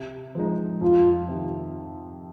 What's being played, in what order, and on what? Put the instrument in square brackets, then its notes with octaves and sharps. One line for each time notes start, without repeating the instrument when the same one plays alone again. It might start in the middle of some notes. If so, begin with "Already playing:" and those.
Already playing: [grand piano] C3
F3 G#3 D#4
[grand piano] F2 [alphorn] F4
[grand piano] C3 D#3